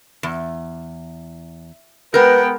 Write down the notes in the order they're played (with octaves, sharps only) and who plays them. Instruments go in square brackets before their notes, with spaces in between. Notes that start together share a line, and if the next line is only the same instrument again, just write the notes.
[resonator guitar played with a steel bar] E2
[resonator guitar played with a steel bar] G#3 A#4 [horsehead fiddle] B3 G5 [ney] B4